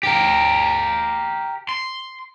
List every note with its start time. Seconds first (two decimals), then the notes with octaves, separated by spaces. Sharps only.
0.03 G4 A#4
1.69 C6